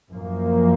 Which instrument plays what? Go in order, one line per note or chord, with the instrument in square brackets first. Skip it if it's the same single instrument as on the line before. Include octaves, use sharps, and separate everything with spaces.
[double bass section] F#2 F3 A#3